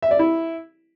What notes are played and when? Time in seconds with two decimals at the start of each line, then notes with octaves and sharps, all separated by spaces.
0.02 E5
0.11 D5
0.19 E4